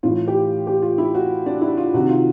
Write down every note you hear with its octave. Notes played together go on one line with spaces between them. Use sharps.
A2 E3 F4
G4
G4
F4
E4
F#4
D4
E4
F4
C3 D#3 F#4
F4